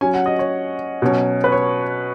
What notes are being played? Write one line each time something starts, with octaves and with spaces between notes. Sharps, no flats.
F#3 C#4 G#5
F#5
D#5
C#5
B2 F#3 C#4
B4
C#5